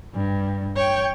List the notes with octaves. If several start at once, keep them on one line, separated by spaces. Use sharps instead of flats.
G2
C#5 G5